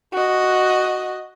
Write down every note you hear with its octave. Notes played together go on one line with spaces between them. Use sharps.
F#4 D#5